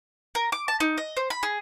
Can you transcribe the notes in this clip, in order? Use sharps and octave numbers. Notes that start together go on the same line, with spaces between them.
A#4
D6
A5
D#4
D#5
C5
B5
G#4